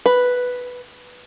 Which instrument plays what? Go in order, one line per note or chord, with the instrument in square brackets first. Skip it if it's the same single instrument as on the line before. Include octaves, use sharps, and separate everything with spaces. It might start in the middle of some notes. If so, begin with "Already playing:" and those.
[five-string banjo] B4